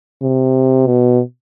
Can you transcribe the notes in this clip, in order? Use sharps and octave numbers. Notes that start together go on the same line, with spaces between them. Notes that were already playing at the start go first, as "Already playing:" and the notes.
C3
B2